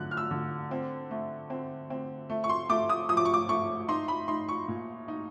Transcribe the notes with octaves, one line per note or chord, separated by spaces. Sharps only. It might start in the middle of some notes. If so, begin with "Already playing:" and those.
Already playing: D3 F#3 F#6
F6
E6
D3
C4
A3
C4
C4
A3
C#6
C6
A3 D6
D#6
F3 D#6
D6
C#6
D6
A3 C#6
D#4 C6
B5
D#4 C6
C#6
A#2
D#4